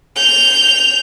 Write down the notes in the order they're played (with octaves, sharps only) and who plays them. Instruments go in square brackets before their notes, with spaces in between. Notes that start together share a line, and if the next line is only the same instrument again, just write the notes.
[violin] G6 F7